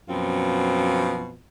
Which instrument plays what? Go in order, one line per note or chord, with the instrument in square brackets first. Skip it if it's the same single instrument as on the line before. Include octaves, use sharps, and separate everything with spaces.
[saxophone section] F#2 B2 F3 C4 F4